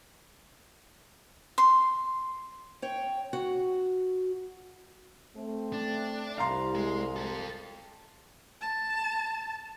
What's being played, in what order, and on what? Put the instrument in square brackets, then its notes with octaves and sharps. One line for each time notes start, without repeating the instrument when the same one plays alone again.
[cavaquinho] C6
[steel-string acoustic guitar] C#5 G5
F#4
[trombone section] A3 C4
[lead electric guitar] D4
[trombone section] C2 [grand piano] F5 A#5 C6
[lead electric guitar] G#3
F4 A4
[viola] A5